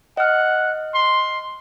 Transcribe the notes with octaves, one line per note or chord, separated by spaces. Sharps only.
D#5 F#5 F6
C6